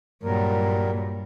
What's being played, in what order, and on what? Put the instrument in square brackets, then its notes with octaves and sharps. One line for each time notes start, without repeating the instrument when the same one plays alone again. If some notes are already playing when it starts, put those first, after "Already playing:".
[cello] G2 A#2 [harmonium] F#3 G3 A#4